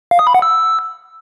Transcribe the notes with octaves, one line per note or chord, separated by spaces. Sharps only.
F5
D#6
B5
F#5
E6